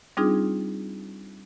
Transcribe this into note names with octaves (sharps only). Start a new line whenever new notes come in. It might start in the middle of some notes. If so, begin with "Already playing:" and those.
G3 C4 D4 D#4 F4 G#4